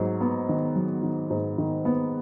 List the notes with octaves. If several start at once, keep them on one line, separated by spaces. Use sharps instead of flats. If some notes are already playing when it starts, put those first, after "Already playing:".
Already playing: G#2 F#3
B3
D#3
F#3
D#3
G#2
D#3
B3